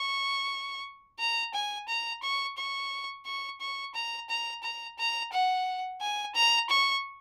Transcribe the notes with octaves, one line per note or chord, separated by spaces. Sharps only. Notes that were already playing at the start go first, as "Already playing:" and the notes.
Already playing: C#6
A#5
G#5
A#5
C#6
C#6
C#6
C#6
A#5
A#5
A#5
A#5
F#5
G#5
A#5
C#6